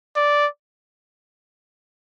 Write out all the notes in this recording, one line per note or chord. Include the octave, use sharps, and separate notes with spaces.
D5